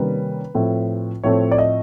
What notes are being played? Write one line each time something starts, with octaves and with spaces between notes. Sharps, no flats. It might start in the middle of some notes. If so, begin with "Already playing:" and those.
Already playing: C3 D#3 G3 A#3 C#4 B4
A2 F3 A3 C4
A2 F3 A3 C4 C#5
D5
D#5